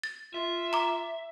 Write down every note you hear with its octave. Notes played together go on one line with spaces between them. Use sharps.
A6
F4 E5
A#5 D6